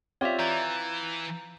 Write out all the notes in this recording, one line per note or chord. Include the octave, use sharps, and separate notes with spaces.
C4 F4 G4 C#5 D5 E5
E3 A#5 G6 A6